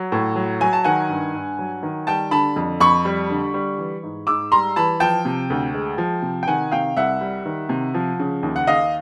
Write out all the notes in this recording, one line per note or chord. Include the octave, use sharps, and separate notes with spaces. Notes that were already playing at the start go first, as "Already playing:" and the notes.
Already playing: F#3
A2
F#3
F#3 G#5
A5
D#3 F#5 G#5
G2
G2
F#3
D#3
G3 G5 A5
D3 A5 B5
F2
F2 B5 C#6
G3
D3
G3
E3
G#2
G#2 D6 E6
G3 A#5 C6
E3 A5 B5
F3 G5 A5
C3
D2
G#3
F3
C3
G5
D#3 F#5 G#5
C3 F5 G5
C2 E5 F#5
G3
D#3
C3
F3
C#3
D#2
F#5
D#2 D#5 F5